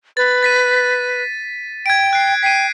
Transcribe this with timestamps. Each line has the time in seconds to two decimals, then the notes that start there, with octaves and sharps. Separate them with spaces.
0.17 B4 A6
0.43 A6 B6 D#7
1.86 G5 G#6 D7
2.13 F#6 C7
2.43 G5 B6 C7 D#7